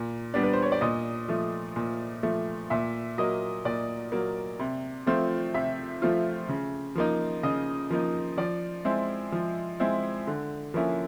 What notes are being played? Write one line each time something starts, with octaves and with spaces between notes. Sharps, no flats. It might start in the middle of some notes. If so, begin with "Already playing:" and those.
Already playing: A#2
G3 B3 D4
B4
C5
C#5
D5
A#2 D#5
F3 A3
A#2
F3 A3
A#2 E5
F#3 A#3 D#5
A#2 D5
F#3 A#3
C3
F3 A3 C4 F4
C3 E5
F3 A3 C4 F4
C#3
F3 A#3 D#4
C#3 D#5
F3 A#3 D#4
F3 D5
G#3 C4 E4
F3
G#3 C4 E4
D3
F3 A#3 C#4 E4